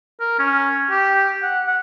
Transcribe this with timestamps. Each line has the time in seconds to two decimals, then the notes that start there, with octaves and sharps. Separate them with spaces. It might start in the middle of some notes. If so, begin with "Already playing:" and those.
0.21 A#4
0.39 C#4
0.90 G4
1.43 F#5
1.67 F#5